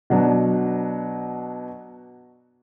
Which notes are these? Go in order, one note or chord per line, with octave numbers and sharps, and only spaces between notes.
B2 F#3 D4